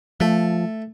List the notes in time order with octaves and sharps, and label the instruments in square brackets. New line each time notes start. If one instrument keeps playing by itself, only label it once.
[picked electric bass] F3 [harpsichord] A3